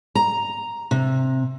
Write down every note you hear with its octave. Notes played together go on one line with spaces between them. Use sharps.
A#5
C3